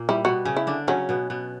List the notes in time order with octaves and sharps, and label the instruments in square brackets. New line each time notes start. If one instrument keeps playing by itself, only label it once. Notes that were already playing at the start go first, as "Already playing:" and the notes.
Already playing: [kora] A#2 A#3
[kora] G3 [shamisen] E4
[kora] B2 B3 [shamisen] F#4
[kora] C#3 C#4
[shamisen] E4
[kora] D3 D4
[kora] C#3 C#4 [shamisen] F#3
[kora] B2 B3
B2 B3